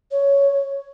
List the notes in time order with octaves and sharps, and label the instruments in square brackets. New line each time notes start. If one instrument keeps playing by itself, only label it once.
[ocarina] C#5